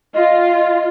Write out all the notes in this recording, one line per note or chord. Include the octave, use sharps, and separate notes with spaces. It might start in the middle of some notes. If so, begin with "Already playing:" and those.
F4 D#5